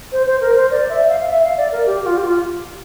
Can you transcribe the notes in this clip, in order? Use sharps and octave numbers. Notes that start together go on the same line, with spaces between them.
C5
C5
A#4
C5
D5
E5
F5
F5
E5
F5
D5
A#4
G4
G4
F4
G4
F4